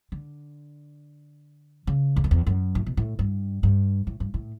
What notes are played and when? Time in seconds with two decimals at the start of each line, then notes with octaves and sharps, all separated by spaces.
0.12 D3
1.87 C#3
2.16 E2
2.24 F#2
2.31 E2
2.47 F#2
2.75 A2
2.86 B2
2.97 A2
3.19 G2
3.63 G2
4.07 A2
4.20 G2
4.34 A2